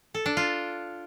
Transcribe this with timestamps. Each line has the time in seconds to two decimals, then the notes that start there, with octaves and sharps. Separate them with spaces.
0.14 A4
0.26 D4
0.37 F4